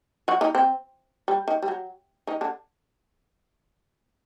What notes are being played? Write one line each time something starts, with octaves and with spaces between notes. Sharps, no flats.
F#3 F#4
D#3 D#4
C4
G3
D#3
G3
F#3
D#3 D#4
D3 D4